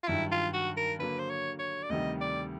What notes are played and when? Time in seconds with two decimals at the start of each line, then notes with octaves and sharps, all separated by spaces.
0.03 F4
0.08 G2 D#3 F#3 E4
0.32 F4
0.53 F#4
0.77 A#4
0.99 D3 F#3 A#3 B4
1.19 C5
1.30 C#5
1.59 C#5
1.83 D5
1.90 D2 C3 D#3 G3 D#5
2.21 D5